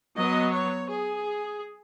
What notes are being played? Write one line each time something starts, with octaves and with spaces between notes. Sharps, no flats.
F#3 B3 D#5
C#5
G#4